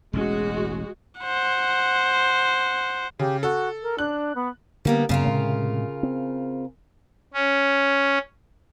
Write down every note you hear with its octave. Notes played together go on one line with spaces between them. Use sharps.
E1 A1 G#3 C#4 F#4
C5 F#5
C#3 G4
F#4 A4
A#4
D4 F#6
B3
D3 G3 A#3 B3
F#2 C#3 A#3 F4 A#4
A2 C3 G#3
C4
C#4